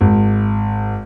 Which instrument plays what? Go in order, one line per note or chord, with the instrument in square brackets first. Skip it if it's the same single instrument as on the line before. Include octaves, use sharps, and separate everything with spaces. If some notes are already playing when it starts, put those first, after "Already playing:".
[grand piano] G#1